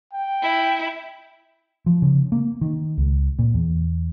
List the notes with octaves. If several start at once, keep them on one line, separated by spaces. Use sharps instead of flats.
G5
E4
F3
C#3
A#3
D#3
C#2
A#2
E2